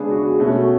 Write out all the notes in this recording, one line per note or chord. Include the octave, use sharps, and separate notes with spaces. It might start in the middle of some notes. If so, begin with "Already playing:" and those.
Already playing: C#3 G#3 B3 D4 G#4
F#4
G#4
B2 A3 C#4 F#4